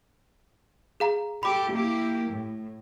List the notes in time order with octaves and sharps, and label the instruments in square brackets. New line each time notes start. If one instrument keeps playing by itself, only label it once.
[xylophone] G#4 F5 A#5
[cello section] G4 A4 [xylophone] B5 D6
[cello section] A#3 E4 G4
A2